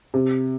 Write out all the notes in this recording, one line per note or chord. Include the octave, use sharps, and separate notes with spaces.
C3